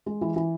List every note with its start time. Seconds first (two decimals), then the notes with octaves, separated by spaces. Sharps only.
0.06 G#3
0.21 E3
0.36 E3